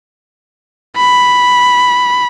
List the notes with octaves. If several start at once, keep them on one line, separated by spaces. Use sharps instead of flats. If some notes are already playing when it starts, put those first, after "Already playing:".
B5